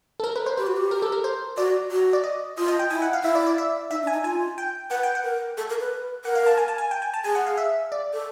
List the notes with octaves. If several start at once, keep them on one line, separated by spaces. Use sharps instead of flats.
A4
A#4
B4
C5
G4 B4
F#4
G4
A#4
A4
A#4
C5
F#4 D5
F#4
D5
D#5
F4 D#5
D#5
G5
E4 G#5
F#5
F5
E4 E5
D5
D5
E5
D#4 E5
D4
G#5
D#4
F4 G#5
G5
B4 F#5
G5
F#5
A#4
A4
A#4
B4
A#4 F#5
F5
A5
G#5
A5
G#5
G5
G#5
A5
G#4 G#5
F#5
F5
E5
D5
A4